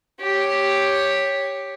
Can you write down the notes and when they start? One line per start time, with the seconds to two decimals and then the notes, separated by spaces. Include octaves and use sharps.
0.20 G4 C#5